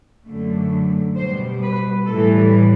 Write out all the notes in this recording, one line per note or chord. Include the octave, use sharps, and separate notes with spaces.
F#2 D3 A3
B2 G3 C5
B4
A2 E3 G3 A4